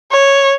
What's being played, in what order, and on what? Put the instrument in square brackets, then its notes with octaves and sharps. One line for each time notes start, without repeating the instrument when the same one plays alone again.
[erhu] C#5